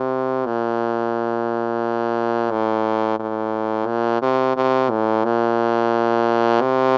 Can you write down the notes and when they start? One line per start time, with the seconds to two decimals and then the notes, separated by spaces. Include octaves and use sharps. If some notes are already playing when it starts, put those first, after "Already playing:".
Already playing: C3
0.46 A#2
2.51 A2
3.20 A2
3.87 A#2
4.22 C3
4.56 C3
4.90 A2
5.25 A#2
6.61 C3